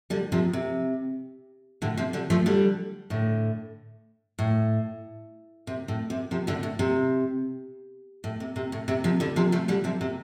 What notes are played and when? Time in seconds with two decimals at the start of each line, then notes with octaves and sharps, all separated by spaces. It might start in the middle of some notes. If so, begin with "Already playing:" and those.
0.10 D3 G3
0.32 C3 F3
0.53 C3
1.82 A2 D3
1.97 C3 F3
2.13 D3 G3
2.30 F3 A3
2.46 D3 G3
3.10 A2 D3
4.39 A2
5.67 C3
5.88 A2
6.10 C3
6.31 C3 F3
6.47 A2 D3
6.63 A2
6.79 C3
8.24 A2
8.40 C3
8.56 C3
8.72 A2
8.88 C3
9.04 C3 F3
9.20 D3 G3
9.36 C3 F3
9.52 F3 A3
9.68 D3 G3
9.84 C3 F3
10.01 C3